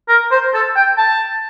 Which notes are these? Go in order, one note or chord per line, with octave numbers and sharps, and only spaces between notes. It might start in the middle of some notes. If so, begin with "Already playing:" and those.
A#4
C5
A4
G5
A5